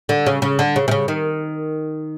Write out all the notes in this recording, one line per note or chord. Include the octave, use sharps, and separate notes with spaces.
D3
C#3
C#3
D3
C#3
C3
C#3
D#3